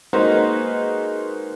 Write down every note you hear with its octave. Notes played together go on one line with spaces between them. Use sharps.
G#3 A#3 D#4 F#4 B4 C5